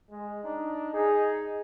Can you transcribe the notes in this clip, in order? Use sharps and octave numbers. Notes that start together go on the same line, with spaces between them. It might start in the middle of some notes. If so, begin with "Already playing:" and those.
G#3
D4 D#4
D#4 G#4